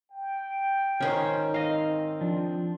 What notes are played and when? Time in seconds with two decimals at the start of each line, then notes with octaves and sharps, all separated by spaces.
0.11 G5
1.00 G#2 D#3 C#4 D#4 C5
1.54 C4 D#5 F5
2.21 F3 D4